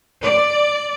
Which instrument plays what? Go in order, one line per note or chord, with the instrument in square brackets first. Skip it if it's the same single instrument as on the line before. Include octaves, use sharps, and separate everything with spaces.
[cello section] D5